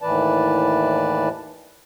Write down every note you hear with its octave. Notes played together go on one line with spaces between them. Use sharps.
D#2 A2 E3 B4 D5 A5